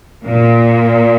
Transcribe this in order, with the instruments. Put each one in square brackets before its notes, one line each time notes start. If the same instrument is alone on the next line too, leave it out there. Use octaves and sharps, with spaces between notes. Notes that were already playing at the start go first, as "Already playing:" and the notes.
[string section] A#2